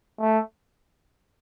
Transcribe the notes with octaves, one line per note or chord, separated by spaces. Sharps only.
A3